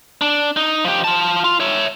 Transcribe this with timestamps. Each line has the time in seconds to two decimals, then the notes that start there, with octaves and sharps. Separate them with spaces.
0.21 D4
0.57 D#4
0.85 F3 G4
1.04 F4 A5
1.44 F4
1.60 C#5 E5